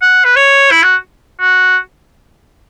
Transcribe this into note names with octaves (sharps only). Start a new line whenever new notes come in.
F#5
B4
C#5
E4
F#4
F#4